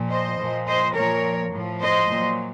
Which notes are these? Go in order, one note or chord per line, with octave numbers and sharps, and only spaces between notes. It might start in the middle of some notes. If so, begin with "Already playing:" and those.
Already playing: A#2 F3
C5 D#5
A#2 F3
C5 D#5
A#2 F3 A#4 C#5
A2 F3
C5 D#5
A#2 F#3